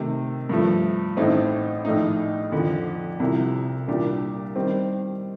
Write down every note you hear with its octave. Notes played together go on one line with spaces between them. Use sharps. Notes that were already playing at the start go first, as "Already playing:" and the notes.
Already playing: C3 D#3 A3
G2 F3 A3
A1 A2 A3 C4 D#4
A#1 A2 A3 D#4
F2 D3 F3
C2 C3 F3
C2 A#2 G3 D4 G4
D#3 G3 C4